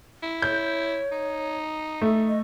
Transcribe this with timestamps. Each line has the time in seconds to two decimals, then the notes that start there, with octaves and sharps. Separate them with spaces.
0.23 E4
0.42 C#5 G6
1.12 D#4
2.01 A3
2.28 D#5